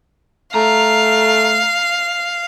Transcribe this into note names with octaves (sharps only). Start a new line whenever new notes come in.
A3 F5 A#5